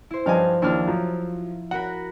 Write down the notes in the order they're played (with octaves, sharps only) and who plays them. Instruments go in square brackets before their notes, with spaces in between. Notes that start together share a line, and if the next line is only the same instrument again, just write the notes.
[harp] E4 C5
[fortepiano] G2 D#5 G#5 [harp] F3 F5
[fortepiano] D#2 D4 F6 [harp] E4 F4
[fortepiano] F3 F#3
[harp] F#4 A#4 B5 [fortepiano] F#5